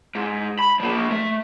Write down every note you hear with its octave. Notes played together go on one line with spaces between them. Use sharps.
G#2
B5
F3 A#3
A3